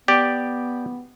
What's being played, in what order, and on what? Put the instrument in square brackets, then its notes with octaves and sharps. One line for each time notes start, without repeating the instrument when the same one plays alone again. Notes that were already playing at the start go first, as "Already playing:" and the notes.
[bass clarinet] B3 [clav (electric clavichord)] G4 D5